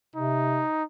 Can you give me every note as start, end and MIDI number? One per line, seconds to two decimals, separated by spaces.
0.16 0.63 48
0.16 0.83 63